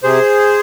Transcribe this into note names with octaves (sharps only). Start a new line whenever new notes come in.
C3 G#4 C5